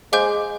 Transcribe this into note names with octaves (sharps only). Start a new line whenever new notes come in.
G#3 C5 F5 G#5 D6 G6